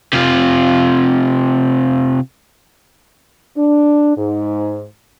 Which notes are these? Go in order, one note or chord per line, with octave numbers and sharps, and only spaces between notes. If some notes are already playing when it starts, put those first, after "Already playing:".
C3 F4
D4
G#2